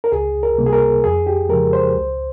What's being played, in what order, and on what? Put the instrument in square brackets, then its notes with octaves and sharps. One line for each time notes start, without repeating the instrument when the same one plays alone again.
[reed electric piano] A#4
C#2 G#4
A#4
C3 G3 A#3
G#4
A#4
F2 G#4
G4
C#3 F3 G#3 A#4
C5
C#2